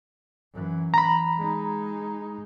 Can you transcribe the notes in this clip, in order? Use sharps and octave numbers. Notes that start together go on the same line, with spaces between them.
F#2 E3
E3 A#5 B5
G#3 D#4